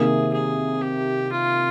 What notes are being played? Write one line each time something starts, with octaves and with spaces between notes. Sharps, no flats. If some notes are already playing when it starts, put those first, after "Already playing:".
Already playing: C3 D#3 A#3 G#4
G#4
G4
F4